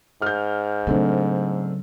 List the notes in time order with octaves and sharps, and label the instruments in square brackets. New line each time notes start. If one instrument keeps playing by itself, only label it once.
[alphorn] G#2 [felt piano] F6 G6
[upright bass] C#3 F#3 [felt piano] A3 C4 D4